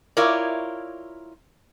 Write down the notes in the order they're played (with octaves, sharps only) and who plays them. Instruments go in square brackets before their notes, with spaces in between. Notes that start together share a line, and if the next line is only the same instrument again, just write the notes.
[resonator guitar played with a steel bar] E4 F4 A#4 C#5 D5